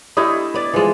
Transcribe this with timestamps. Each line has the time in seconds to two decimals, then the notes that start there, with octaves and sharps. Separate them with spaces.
0.17 A3 D4 E4 G4 D#5
0.54 B3 D5
0.73 E3 F3 G#3